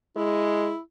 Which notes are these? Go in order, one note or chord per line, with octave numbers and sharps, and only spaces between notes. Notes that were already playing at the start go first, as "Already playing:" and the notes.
G#3 E4